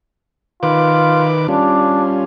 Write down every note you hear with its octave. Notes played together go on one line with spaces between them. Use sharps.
D#3 F4 B4 D6
G3 C#4 D4 F4